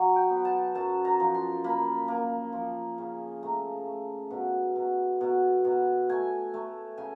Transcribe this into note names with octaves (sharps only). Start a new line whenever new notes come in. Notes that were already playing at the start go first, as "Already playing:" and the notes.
Already playing: F#3
G5
B3
A5
F#2 A5
A#5
F3
C6
A#3 B5
A#3
F3
C#3
A3 A#5
A3
B2
B2
B2
B2
A3 G#5
A3
C#3 G#5